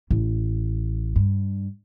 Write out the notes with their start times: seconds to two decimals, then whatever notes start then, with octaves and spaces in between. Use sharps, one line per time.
0.11 A1
1.16 G2